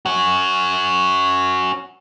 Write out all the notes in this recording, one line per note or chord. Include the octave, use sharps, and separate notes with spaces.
C#4 F#4